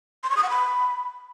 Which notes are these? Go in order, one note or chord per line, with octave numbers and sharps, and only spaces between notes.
C6
C#6
D#6
F#5
B5